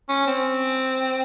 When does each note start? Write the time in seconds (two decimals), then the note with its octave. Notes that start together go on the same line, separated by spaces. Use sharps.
0.09 C#4
0.27 C4